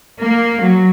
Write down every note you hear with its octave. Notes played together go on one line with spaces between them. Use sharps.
A#3
F#3